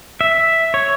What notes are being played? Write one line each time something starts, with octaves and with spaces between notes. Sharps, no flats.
E5
C#5